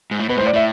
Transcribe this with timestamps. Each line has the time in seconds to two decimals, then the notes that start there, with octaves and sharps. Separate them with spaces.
0.11 G#2
0.20 A2
0.29 B2 B4
0.36 G#2 C5
0.41 A2
0.46 D5
0.53 A2 E5